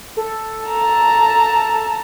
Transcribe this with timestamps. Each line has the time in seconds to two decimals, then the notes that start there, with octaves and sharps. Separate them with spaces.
0.17 A4
0.67 A5 A#5